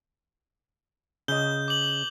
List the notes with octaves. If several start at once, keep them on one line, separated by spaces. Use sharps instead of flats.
C#3 D#5 G6 G7
D6 F#7